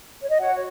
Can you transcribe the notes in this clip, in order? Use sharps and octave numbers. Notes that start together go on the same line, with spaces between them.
C#5
D#5
F#4 C#5 F#5
C#5